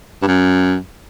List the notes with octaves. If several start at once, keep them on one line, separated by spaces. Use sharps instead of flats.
G2
F#2